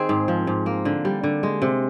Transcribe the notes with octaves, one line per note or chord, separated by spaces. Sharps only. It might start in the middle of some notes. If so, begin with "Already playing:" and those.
Already playing: D#3 C4 G#4
G#2
F3
G#2
A#3
D3
G3
D3
G#3
C3